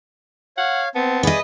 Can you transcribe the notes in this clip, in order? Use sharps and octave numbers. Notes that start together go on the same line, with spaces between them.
C#5 F5 F#5
B3 C4 A5
G#4 B4 D5 D#5